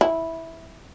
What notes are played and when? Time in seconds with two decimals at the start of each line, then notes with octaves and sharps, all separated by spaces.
0.01 E4